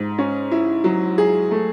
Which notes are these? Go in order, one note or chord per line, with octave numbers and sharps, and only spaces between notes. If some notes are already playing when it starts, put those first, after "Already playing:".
Already playing: G#2
C#4
E4
F#3
G#4
A3